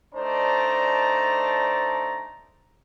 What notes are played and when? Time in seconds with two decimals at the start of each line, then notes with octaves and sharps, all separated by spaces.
0.15 A3 D4 D#4 C5 D5 A#5